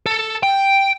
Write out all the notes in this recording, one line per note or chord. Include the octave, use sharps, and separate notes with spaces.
A4
G5